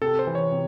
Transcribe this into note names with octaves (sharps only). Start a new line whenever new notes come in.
C3 A4
C5
E3
C#5
C3